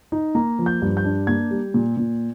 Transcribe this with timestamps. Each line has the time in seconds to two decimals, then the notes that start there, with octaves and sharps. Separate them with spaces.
0.12 D#4
0.35 A#3 A#5
0.59 F3
0.66 G6
0.82 G2
0.97 G6
1.04 D4
1.27 A#3 G#6
1.51 G3
1.74 A#2
1.97 A#2